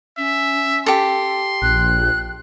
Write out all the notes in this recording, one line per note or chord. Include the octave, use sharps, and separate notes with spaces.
C#4 E5
G4 A4 C6
A#1 F#6